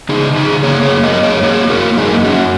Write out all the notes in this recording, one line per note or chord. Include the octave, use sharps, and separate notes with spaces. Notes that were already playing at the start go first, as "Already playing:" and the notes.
C#3 D#4 G#4
C#3 D#4 G#4
A#3 G#4 C#5
G#4 C#5
F#2
A#4 D#5
A#3
G#4 C#5
A#3 G#4 C#5
A#3 F#4 A#4
F#2 D#4 G#4
F#3 C#4 F#4